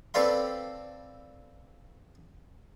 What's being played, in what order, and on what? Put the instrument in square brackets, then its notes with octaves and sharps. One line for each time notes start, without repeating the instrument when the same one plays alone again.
[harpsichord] C4 A4 B4 D5 F5 C6